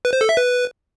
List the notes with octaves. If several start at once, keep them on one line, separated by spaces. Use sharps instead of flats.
B4
C5
A4
E5
B4